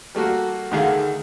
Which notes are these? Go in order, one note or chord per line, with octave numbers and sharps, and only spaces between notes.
G3 A3 A#3 F#4
D2 D3 D#3 G#4 F5 F#5